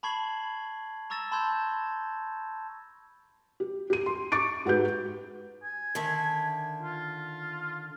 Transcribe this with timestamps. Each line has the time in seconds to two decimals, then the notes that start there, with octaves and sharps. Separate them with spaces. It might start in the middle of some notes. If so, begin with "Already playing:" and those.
0.03 A5 B5 C#6 G#6 C7 F#7
1.10 A#5 C#6 E6 A6 A#6 E7
1.32 A5 B5 C6 E6 G6 G#6
3.60 G4
3.90 G4 D#7
4.06 C6
4.32 C#6 D6 A6 D7
4.65 G#2 F#4 G4 B4 G6
5.63 G#5
5.95 D3 D#3 E5
6.82 F4